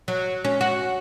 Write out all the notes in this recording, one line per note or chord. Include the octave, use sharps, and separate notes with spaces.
F#3
C#4
F#4